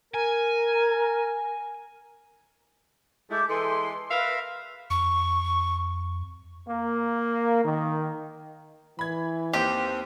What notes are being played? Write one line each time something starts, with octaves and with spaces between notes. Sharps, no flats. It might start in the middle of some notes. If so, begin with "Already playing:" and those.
A#4 G#5
G#3 A3 E4 D6 G6
E3 G#3 A4 C6
A#4 B4 E5 F5
F2 C#6
A#3
D#3
E3 B5 G#6
D#2 C4 G4